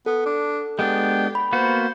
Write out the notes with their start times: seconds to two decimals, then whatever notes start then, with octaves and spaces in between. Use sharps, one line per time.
0.06 B3 A4
0.25 D4
0.79 G#3 B3 D4 G4
1.35 B5
1.53 A#3 B3 F#4 C5